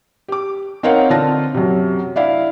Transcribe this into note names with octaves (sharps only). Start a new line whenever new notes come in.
G4 D6
C4 D#4 A#4 C#5 F5 F#5
D3 C4 F4 A5 A#6
F#2 C3
D4 E4 F5